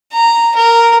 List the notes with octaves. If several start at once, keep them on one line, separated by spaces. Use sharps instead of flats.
A#5
A#4